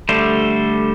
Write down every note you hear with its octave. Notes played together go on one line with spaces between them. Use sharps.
D3 G3 A3 C5